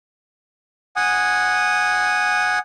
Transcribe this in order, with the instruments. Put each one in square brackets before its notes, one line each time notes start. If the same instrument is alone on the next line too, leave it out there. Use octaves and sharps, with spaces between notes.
[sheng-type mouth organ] F#5 G#5 D#6